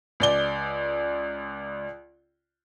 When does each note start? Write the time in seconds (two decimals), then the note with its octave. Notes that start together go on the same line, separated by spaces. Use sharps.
0.20 C#2 D5 G7